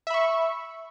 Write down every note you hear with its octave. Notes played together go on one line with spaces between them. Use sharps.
E5 B5 C#6